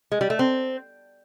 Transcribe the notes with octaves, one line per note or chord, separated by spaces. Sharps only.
G#3
G3
A3
C4